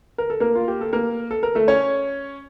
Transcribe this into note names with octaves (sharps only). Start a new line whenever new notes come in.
A#4
A4
A#3 A#4
F4
G4
A4
A#3 A#4
A4
A#4
A3 A4
C#4 C#5